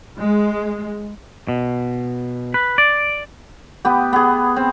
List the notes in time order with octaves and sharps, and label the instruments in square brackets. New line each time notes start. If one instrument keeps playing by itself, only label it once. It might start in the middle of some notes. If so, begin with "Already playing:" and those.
[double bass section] G#3
[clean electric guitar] B2
B4
D5
[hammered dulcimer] B3 G4
B3 G#4
C4